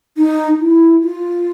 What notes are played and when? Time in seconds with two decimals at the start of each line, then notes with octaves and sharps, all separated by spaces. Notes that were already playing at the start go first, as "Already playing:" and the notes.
0.18 D#4
0.60 E4
1.03 F4